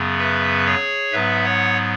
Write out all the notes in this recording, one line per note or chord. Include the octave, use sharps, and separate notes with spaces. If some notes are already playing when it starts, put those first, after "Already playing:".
Already playing: F#2 C#3 F#3 B3
B4 E5
G#4 C#5
G#2 F#3 B3 B4 E5
C#5 F#5